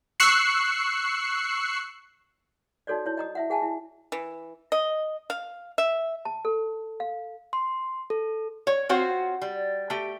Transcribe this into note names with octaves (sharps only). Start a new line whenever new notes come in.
C#6 E6 F#6 C7 C#7
D#4 F#4 A4 C#5 D5
E4 C#5
D#5 A#5 D#6
E4 E5 F#5
G#4 F#5 G#5 A5
E4
E3
D#5
F5
E5
A5
A4
F5
C6
A4
C#5
C4 F4 F#4 C5 C#5
G3
A3 G4